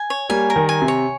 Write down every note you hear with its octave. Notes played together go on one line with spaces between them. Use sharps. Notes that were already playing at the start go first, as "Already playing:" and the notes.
Already playing: G#5
C#5
G3 A#3 G#5
A#4
D#3 G3
G#5
C3
C#5